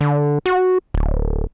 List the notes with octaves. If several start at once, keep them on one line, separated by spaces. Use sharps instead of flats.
D3
F#4
D1